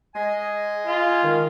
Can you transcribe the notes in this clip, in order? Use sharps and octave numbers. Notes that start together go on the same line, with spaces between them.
G#3 D#5 G#5
F4
D#3